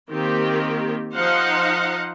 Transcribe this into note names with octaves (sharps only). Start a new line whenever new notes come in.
D#3 A#3 C4 G4
F3 D#4 C5 D#5 F5 F#5